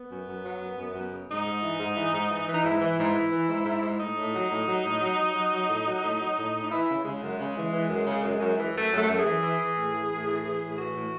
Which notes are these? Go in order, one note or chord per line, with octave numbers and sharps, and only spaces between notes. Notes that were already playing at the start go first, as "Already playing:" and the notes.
Already playing: B3
F#2
F#2
F#3
F#2
F#2
F#2
C#3
G#2 D#4
G#2
E3
G#2
E3
G#2
E3
E3
D#4
G#2 E4
E3
G#2
E3
E3
G#2
G#2
G#2
A2 D#4
A2
F#3
A2
F#3
A2
F#3
F#3
F#3
F#3
A2
F#3
A2
F#3
A2
A2
D#4
E3 E4
C#3
C#3 G#3
F#2
C#3
E3
E3
F#2
C#3
F#2
F#2
E3
F#2 A3
F#2
A3
F#2
G#4
E3
E3
E3
A2
E3
A2
E3
E3
A2
E3 F#4
A2